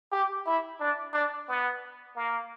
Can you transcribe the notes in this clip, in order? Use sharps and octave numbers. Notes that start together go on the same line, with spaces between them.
G4
E4
D4
D4
B3
A#3